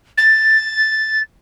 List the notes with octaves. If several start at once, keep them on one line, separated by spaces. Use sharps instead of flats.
A6